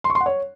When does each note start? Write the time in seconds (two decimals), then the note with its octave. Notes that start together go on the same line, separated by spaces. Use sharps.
0.04 C6
0.10 C#6
0.15 C6
0.21 F#5
0.26 C#5